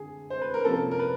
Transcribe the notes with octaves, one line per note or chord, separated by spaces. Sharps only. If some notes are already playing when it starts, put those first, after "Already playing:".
Already playing: D3 G#4
C5
B4
A#4
C3 F3 A#3 C#4 A4
A#4
B4